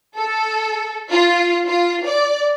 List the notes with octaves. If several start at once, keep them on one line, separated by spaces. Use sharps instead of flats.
A4
F4
F4
D5